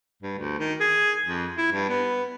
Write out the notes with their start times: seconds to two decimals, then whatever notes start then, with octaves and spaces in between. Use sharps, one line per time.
0.22 G2
0.38 D2
0.59 D#3
0.80 G#4
1.26 F2
1.57 E4
1.72 G2
1.89 B3